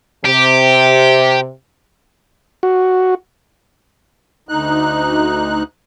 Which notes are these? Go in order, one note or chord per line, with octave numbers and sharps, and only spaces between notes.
C3 G4
F#4
D2 D#4 F#6